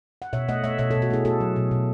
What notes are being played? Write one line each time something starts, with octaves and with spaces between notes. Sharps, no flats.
F#5
B2 C#5 E5
A3 D#5 F#5
A3 C#5 E5
B2 C#5 E5
A4 C#5
B2
F#4 A4
A3 E4 G#4
A3 F#4 A4
F#3
B2
B2